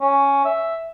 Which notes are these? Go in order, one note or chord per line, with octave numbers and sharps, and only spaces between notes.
C#4
E5